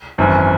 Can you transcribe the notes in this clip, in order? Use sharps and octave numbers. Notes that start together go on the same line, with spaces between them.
G#1 F#2 E3